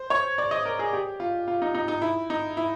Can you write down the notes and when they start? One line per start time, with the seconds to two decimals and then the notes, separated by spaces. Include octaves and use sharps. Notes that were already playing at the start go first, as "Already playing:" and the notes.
Already playing: C5
0.10 C#5
0.38 D5
0.51 D#5
0.65 A#4
0.79 G#4
0.93 G4
1.20 F4
1.48 F4
1.62 D#4
1.75 D#4
1.88 D#4
2.02 E4
2.30 D#4
2.57 E4